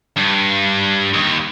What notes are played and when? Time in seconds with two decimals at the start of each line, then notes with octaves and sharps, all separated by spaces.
0.17 G2
1.14 D#2